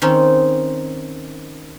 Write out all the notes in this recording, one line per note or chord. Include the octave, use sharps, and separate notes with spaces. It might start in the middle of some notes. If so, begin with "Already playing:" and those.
D#3 C4 C#4 D#4